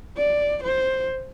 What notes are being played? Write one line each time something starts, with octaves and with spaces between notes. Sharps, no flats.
D5
C5